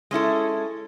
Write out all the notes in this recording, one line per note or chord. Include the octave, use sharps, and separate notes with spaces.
G#3 C#4 E4 A4